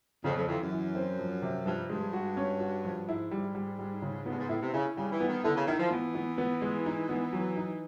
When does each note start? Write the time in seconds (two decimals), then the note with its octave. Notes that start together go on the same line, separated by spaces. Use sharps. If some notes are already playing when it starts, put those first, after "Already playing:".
0.24 F2 C#3
0.37 F2
0.48 F2 E3
0.60 F#2
0.72 E3
0.95 C4
1.19 F3
1.42 C3
1.66 G2 F3
1.89 G2 G#3
2.13 F#4
2.37 C#4
2.60 F#4
2.85 F3
3.08 G#2 E4
3.31 G3
3.55 G3
3.79 G3
4.02 C#3
4.26 G2 B3
4.39 G#2
4.49 A2 E4
4.62 C3
4.73 C#3 E4
4.97 C#3 G3
5.12 E3
5.21 B3
5.29 D#3
5.44 D3 E4
5.56 C#3
5.67 D#3 E4
5.80 F3
5.91 E3 B3
6.15 B3
6.38 B3
6.62 G#3
6.86 D#4
7.09 B3
7.33 F#3
7.57 D#4